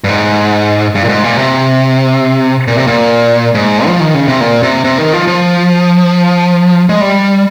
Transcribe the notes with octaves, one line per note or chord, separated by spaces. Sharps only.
G2
G#2
G2
A#2
G#2
A#2
C3
A#2
C3
A#2
G#2
F3
D#3
C#3
C3
A#2
C3
C3
D#3
F3
F3
G#3
G3